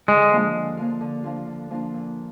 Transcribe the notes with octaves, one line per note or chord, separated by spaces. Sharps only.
D3 G#3
F3 A#3 D4 F4
D3
F3 A#3 D4 F4
D3
F3 A#3 D4 F4
D3
F3 A#3 D4 F4
A#2